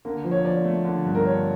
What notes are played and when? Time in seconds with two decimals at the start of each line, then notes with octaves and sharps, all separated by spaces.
0.05 D3 A#3
0.24 F3
0.31 C#5
0.44 F3 D5
0.65 A3
0.84 D3
1.05 G2
1.15 A#4
1.24 D3 C#5